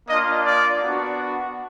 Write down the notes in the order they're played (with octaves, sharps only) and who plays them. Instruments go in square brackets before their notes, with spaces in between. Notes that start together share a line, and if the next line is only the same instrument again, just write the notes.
[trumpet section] A#3 D4 F4 D#5
D5
B3 D4 F#4